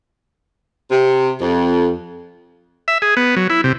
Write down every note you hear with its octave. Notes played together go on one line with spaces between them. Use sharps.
C3
F2
E5
G#4
B3
F#3
E4
C3